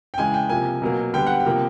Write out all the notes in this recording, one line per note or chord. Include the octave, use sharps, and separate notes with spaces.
G5
C#3 E3 G#3 G#5
G5
C3 F3 A#3 G#5
B2 F#3 A#3
D3 G3 B3 G5
F#5
G5
C3 F3 A#3